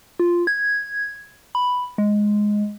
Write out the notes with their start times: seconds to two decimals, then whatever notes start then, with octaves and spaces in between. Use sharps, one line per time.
0.20 F4
0.47 G#6
1.55 B5
1.98 G#3